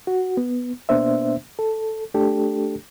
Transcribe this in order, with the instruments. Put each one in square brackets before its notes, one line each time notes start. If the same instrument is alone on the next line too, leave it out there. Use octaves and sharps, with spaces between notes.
[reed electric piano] F#4
B3
B2 A#3 B3 D4 C5 E5
A4
A3 D4 G4 A4